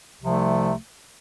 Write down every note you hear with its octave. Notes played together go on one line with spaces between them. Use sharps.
C2 C3 F3 A3